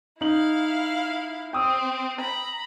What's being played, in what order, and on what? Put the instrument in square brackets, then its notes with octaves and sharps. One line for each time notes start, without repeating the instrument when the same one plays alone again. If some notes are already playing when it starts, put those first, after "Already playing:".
[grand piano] D#4 F#7 [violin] E4 F5
[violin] C4 [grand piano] G5 D#6 E6
[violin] A#5 B5